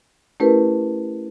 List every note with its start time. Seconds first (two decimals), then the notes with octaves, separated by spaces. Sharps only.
0.40 A3 C#4 E4 G4 A#4 B4